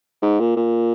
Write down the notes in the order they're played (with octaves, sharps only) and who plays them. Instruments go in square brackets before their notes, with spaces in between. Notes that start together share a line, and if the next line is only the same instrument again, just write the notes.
[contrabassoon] G#2
A#2
A#2